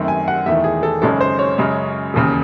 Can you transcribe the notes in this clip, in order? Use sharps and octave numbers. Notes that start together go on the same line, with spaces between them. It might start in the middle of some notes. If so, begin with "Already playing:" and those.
Already playing: F#2 D#3 A3 C4
G#5
F#5
E1 E2 D#3 A3 E5
G#4
A4
G#1 F#2 C#3 G#3 C#4 A4
C5
C#5
F#2 C#3 G#3 C#4
E1 D#2 C#3